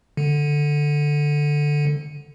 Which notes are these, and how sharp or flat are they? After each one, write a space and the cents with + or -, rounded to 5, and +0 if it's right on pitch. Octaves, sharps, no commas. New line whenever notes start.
D3 +5